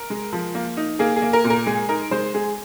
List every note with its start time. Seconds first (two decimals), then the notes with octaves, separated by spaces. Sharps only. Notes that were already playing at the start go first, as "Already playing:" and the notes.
Already playing: A#4
0.10 G#3
0.33 F3
0.55 A#3
0.77 D#4
0.99 A#3 G#4
1.16 G#4
1.22 A#3
1.33 A#4
1.44 A#2
1.50 A#4
1.66 G#3 G#4
1.89 D#4 A#4
2.11 G#3 C5
2.34 G#3 G#4